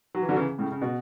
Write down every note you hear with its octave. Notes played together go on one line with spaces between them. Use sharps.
F#3
E3
D3 F#3
C#3 E3
A2 C#3
C#3
B2